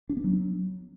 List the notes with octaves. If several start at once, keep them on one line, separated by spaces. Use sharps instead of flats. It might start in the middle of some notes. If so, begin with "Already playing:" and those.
D4
B3
F#3